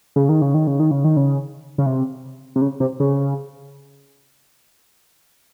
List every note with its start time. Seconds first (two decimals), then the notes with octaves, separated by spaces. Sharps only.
0.16 C#3
0.29 D#3
0.42 C#3
0.54 D#3
0.67 C#3
0.80 D#3
0.91 C#3
1.04 D#3
1.17 C#3
1.78 C#3
1.86 C3
2.56 C3
2.61 C#3
2.80 C3
3.00 C#3